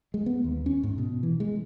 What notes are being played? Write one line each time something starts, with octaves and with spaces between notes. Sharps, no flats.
G#3
B3
D#2
C#4
G#2
B2
E3
G#3